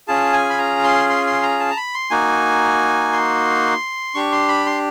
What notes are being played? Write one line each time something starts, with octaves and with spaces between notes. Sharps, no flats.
C#4 F4 G#4 A5
G#5
B5
A#5
C6
C6
C6
A#5
A5
A#5
B5
C6
A#3 D#4 F#4 G#5
C6
D4 G4 C#6
C6
B5
C6